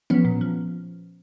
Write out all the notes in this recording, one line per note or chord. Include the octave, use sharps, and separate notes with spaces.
F3 B3 C#4
A#2
F3